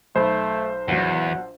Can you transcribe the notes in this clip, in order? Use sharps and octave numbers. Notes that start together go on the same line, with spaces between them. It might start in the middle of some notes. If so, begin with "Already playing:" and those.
B1 A3 C5 B5
A#1 E2 F#3 F#5